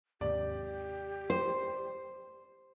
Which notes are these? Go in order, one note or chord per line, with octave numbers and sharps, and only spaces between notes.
D#2 G#2 C3 G4 D5
C5